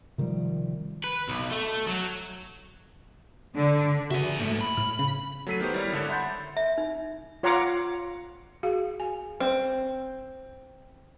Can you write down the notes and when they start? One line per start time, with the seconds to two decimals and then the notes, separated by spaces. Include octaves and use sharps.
0.18 C3 D#3 F3 G3
1.04 B4
1.29 B1
1.51 A3
1.87 F#3
3.57 D3
4.11 C#3 F#4 G#4 E5
4.40 G#2 A3
4.61 B5
4.77 A2 F6
4.99 C#3
5.47 F#3 A3 A4 B6 C7 D#7
5.60 D#3 B3 G4 C5
5.74 G3 E4 A#4 C#5
5.92 G#1 D3 D4 C#5
6.09 E5 F#5 B5 C6 G6 A6
6.57 E5
6.78 D#4
7.43 F4 C#5 F5 F#5 A#5 D6
8.63 F#4 G#4 F5
9.00 G#5
9.40 C4